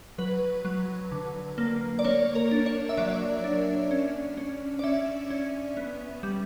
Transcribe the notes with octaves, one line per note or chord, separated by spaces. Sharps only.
F#3 B4
F#3
D3
A#3
D5
A#3 C#5
A#4
D4
C#5
E5
F#3 D5
D4
C#4
C#4
D5
C#4 E5
C#4
B3
G3